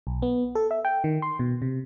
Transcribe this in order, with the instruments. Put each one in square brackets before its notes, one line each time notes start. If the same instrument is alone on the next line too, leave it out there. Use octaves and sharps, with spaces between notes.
[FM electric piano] B1
B3
A4
E5
G5
D#3
C6
B2
C3